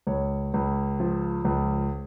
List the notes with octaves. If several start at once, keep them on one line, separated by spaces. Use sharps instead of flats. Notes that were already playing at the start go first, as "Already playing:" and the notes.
C#2 C#5
C#2
F3
C#2